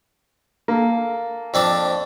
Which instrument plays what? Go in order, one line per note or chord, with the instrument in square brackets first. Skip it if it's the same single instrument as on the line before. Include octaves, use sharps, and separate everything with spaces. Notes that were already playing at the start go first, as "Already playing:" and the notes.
[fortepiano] A#3 A4
[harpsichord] F2 C4 D4